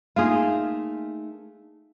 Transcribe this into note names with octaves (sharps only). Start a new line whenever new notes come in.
A3 A#3 D#4 F4 G#4